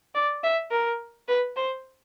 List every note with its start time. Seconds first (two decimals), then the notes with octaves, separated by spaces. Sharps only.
0.15 D5
0.43 E5
0.71 A#4
1.28 B4
1.56 C5